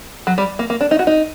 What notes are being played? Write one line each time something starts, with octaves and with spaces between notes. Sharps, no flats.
F#3
G3
A#3
A#3
D4
D#4
F#4
D#4